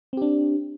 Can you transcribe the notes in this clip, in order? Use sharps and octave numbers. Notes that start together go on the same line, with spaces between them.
C4 D4 G4